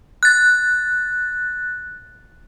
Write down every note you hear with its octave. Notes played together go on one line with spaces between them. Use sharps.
F#6 A6